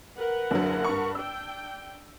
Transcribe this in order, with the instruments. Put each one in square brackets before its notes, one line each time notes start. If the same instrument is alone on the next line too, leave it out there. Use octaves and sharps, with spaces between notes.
[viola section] A#4 B4 F#5
[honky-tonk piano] F#1 D3 F#3
G2 C#6
[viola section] D4 G5 [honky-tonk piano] E6